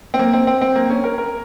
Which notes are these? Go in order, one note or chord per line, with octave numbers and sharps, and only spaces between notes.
C4
A#3
C4
C4
C4
A#3
C#4
A#4
A#4